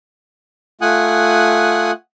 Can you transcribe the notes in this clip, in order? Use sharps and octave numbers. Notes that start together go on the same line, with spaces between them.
A3 F4 F#5 G#5 D#6 F#6